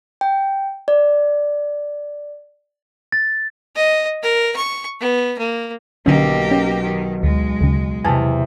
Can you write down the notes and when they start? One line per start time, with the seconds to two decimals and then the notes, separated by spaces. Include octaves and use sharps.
0.21 G5
0.88 D5
3.12 A6
3.76 D#5
4.23 A#4
4.56 C#6
5.00 B3
5.38 A#3
6.06 B1 D3 A#3 C#4 G4
6.51 C#4
6.83 D#3
7.23 D2 G#3
7.61 D2 C#3
8.05 E2 C3 G#5 A5